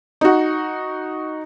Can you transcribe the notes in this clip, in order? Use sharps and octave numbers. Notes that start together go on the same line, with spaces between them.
D#4 F#4